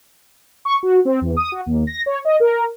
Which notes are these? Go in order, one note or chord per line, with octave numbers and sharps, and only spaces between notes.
C#6
F#4
C4
E2
D#6
F#4
D#2
A#6
C#5
D#5
A#4